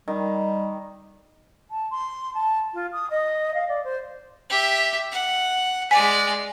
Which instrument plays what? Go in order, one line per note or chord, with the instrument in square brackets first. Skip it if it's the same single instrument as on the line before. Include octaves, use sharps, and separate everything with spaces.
[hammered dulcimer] D#3 [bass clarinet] G3
[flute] A5
C6
A5
F4
D#6
D#5
F5
D5
C5
[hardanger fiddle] G4 E5
F#5
[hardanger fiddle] G#3 D5 [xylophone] G#5 B6